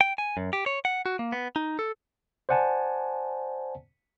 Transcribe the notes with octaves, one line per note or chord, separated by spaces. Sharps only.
G5
G#5
F#2
G4
C#5
F#5
F#4
A#3
B3
D#4
A4
C5 D5 F#5 G#5 A5